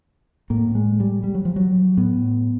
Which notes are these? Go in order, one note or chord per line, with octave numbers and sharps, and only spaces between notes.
A2 A#3
G#3
G3
G3
F#3
F3
F#3
A2 B3